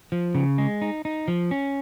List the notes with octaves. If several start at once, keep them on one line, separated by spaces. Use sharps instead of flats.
F3
C#3
G#3
D#4
D#4
F3
C#4